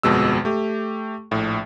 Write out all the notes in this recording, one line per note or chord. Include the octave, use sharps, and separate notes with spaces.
G1 F2 B2 G#3 E6
A3 G4
A#1 A2